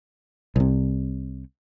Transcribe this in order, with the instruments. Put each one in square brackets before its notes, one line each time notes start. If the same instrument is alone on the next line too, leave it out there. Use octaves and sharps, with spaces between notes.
[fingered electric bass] C2 C3